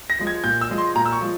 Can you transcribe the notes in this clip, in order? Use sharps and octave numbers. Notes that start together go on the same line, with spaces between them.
A#6
F3 G#3
G#6
A#2 G6
E6
F3 G#3
C6
A#2 A#5
E6
C#6
F3 G#3